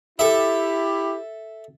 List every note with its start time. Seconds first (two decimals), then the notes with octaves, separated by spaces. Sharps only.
0.19 E4 G4 A4 E5